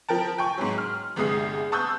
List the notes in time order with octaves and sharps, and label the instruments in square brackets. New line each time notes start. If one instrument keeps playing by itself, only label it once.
[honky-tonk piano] F3 A#4 G5 A5
G5 G#5 C#6
G#2 F#3
F6
G1 C2 G#3 D#6 C7
A5 C#6 D#6 E6 F#6 G6